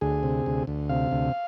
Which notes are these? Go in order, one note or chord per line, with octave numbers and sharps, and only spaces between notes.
D2 G#4
C3
D2
D2
C3 F5
D2